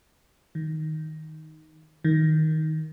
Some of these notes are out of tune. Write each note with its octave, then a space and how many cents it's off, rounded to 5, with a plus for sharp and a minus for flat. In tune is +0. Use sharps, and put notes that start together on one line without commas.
D#3 +5
D#3 +10